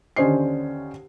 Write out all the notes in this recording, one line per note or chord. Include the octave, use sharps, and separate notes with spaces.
D#2 D3 C#4 C5 D#5 C7